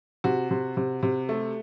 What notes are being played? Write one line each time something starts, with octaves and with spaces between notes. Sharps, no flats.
C3 F#4
C3
C3
C3
A3